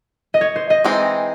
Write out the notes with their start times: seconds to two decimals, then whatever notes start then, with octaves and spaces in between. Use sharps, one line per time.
0.34 D#5
0.41 C#5
0.56 C5
0.70 D#5
0.85 E3 G#3 C4 D#4